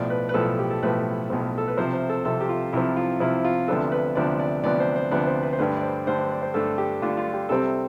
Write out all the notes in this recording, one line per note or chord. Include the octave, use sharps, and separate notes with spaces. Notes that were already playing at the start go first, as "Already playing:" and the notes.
Already playing: B1 A2 F3 D5
B4
B4
B1 A2 F3 A4
G4
A4
B1 A2 F3 B4
B1 A2 F3
A4
B4
C2 C3 F3 C5
C5
A4
C2 C3 F3 A4
G4
F4
C2 C3 F3 E4
F4
C2 C3 F3 E4
F4
D2 C3 F3 B3 D4 A4
B4
D2 C3 F3 B3 D4 D5
D5
D2 C3 F3 B3 D4 D5
C5
C5
D2 C3 F3 B3 D4 D5
C5
B4
C5
G2 D3 A3 D4 B4
D5
C5
G2 D3 A3 D4 C5
C5
D5
C5
G2 D3 A3 D4 A4
G4
G2 D3 A3 D4 F4
F4
G4
C2 C3 G3 C4 A4